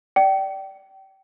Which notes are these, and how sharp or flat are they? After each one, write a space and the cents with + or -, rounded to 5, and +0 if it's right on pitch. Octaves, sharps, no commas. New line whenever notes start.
D5 +0 G5 -30